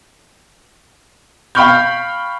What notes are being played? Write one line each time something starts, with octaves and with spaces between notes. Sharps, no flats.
F5 G5 B5 C#6 F6 G6